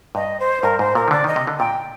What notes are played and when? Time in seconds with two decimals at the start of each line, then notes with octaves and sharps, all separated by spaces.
0.15 G2 D#5
0.40 C5
0.63 G2 A#4
0.79 G#2 C5
0.95 A#2 A#4
1.08 D#3
1.11 D3 D5
1.24 D#3 D#5
1.36 C3
1.47 D3
1.59 A#2 G5